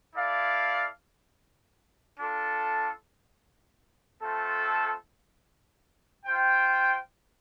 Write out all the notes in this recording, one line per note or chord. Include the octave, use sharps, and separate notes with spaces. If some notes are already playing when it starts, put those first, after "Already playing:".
E4 A4 D5 F5
D4 F4 A4
A3 C4 F4 A4
F4 C5 G5